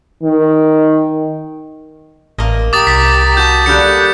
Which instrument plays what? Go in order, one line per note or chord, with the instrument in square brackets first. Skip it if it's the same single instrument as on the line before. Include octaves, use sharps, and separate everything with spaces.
[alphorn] D#3
[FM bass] A1 [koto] A#3 D#5
[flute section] G4 A#5 [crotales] D6 D#6 A6
[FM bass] C2 [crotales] B6
[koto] F#4 [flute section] A5 [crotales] G6
[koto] D3 G3 A#3 [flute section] F#6 G6 [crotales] C#7